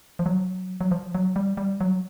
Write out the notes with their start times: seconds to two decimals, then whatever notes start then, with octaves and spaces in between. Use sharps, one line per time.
0.19 F3
0.26 F#3
0.81 F#3
0.91 F3
1.15 F#3
1.36 G3
1.57 G3
1.81 F#3